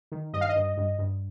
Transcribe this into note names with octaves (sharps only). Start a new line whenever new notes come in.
D#3
G2 D#5
F5
D#5
G2
G2
G2